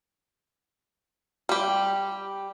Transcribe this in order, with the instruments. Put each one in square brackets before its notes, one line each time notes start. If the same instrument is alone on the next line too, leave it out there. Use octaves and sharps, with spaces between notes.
[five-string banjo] G3 G4